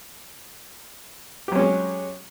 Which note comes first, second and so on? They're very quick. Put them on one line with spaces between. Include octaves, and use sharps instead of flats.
G4 F#3 C#4 G#3